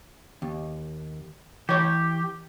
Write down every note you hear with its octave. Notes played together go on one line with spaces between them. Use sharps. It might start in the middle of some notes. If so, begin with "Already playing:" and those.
D#2
E3 G4 C#5